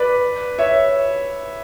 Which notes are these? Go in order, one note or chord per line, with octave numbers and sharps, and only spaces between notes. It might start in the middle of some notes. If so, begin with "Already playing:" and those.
Already playing: B4 D5
C#5 E5